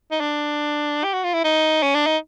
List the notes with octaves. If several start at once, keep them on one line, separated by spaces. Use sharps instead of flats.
D#4
D4
G4
F#4
F4
E4
D#4
C#4
D4
D#4